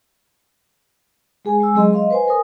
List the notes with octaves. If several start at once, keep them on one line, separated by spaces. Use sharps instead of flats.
G#3 G#4 G#5
G#3 G#5 E6
F#3 G#3 C4 G#4 D#5 C6
D#5 F5 C6
B4 C5 G#5
A#4 G#5 D#6